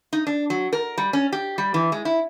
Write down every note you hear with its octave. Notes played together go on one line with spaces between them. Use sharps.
D#4
D4
F#3
A#4
G3
C#4
G4
G3
E3
G#3
E4